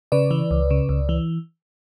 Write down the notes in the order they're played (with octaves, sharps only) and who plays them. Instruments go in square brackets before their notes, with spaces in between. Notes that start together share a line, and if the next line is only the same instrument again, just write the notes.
[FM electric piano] C#3 B4 D5
E3
C#2
C#3
C#2
E3